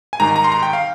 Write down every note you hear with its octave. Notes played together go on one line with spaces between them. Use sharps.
G#5
G#2 D#3 G3 A#5
A#5
C6
A#5
G5
F5